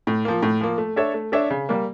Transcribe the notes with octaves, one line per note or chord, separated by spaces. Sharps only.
A2
F3 A#3
A2
F3 A#3
A3
D4 A4 C#5 E5
A3
D4 A4 C#5 E5
C#3
G3 A#3